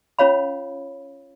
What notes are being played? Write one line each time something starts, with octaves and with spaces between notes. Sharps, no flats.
C#4 F4 C#5 F5 B5